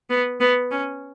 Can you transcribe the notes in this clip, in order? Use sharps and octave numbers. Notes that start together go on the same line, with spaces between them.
B3
B3
C#4